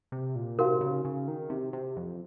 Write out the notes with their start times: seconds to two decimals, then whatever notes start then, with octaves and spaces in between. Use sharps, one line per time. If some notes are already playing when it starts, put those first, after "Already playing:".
0.12 C3
0.35 A#2
0.58 C3 D#4 F#4 A#4 F5
0.81 C#3
1.05 C#3
1.28 D#3
1.50 C3
1.73 C3
1.97 F2